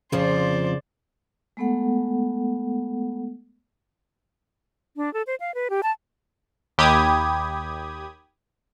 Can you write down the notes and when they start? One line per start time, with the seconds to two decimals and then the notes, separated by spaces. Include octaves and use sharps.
0.12 F2 C#3 F3 C5 D5
1.57 G#3 A3 B3 A4 F#5
4.96 D4
5.14 A4
5.27 C5
5.40 F5
5.55 B4
5.70 G4
5.83 A5
6.78 D#2 G4 B5 D#6 G#6